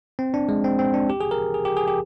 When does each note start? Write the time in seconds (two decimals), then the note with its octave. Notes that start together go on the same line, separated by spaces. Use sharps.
0.19 C4
0.34 D4
0.49 G#3
0.64 C4
0.79 C4
0.94 D4
1.09 G4
1.20 G#4
1.31 A#4
1.54 G#4
1.65 G4
1.77 G#4
1.88 G4